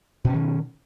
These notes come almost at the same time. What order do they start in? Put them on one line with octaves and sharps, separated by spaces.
B2 C#4 D#3